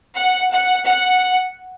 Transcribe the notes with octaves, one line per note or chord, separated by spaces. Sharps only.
F#5
F#5
F#5